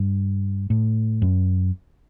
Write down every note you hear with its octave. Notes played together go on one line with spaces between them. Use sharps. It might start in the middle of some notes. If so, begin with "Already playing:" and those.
Already playing: G2
A2
F#2